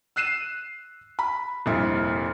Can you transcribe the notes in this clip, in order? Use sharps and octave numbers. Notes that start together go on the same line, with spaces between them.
E6 F#6 C7 D#7 E7
B5
F1 G2 A#2 E4